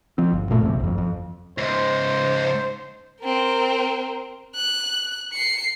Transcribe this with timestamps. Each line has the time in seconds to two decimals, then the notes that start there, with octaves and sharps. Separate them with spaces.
0.18 F3 C4
0.32 G1
0.50 G2 A#2 A3
0.61 C2 F2 C3
0.80 G1 F2
0.98 F2
1.58 C#2 G#2 C5
3.21 C4 A#4
4.55 F#6
5.32 C7 C#7